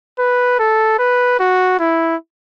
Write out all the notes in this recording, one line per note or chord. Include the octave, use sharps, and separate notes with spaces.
B4
A4
B4
F#4
E4